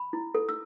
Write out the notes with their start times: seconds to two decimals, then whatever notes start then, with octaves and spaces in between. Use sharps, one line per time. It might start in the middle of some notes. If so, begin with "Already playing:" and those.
Already playing: B5
0.13 E4
0.35 A4
0.49 E6